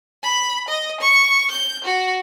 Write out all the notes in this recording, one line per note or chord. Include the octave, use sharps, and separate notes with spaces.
B5
D#5
C#6
G6
F#4